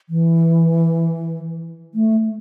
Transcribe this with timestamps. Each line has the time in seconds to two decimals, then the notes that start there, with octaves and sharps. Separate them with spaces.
0.09 E3
1.95 A3